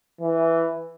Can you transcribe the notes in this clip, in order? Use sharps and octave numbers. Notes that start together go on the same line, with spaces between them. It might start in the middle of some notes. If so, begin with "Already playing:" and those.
E3